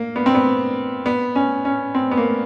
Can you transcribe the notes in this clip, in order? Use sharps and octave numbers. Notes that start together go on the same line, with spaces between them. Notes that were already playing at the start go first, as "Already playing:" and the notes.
Already playing: A#3
B3
C4
B3
B3
C#4
C#4
C4
B3
A#3